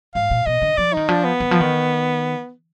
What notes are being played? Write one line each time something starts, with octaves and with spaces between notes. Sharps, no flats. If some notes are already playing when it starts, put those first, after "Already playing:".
G#2 F5
A#2
B2 D#5
D3
F3 D5
D#3 D#4
F3 D4
B3
D#3
F3
D#3